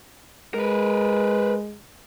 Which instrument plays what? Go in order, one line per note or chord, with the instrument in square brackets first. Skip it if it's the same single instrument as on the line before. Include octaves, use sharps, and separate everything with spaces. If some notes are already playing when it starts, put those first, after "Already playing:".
[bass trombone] G#3 [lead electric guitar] A#4 B4